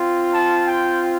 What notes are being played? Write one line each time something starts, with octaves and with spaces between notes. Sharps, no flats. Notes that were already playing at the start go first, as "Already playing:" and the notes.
Already playing: C4 F4
A5
G5